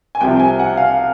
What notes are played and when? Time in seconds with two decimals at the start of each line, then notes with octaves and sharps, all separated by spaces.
0.15 G#5
0.21 C2 C3 F3 G5
0.40 G#5
0.59 F#5
0.77 F5